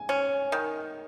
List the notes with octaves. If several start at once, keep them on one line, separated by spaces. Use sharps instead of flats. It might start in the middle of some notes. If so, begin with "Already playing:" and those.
Already playing: G#5
C#4
D#3